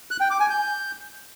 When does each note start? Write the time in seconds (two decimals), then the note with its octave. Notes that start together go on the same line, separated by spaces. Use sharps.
0.11 F#6
0.21 G5
0.30 D6
0.40 G#5
0.50 G6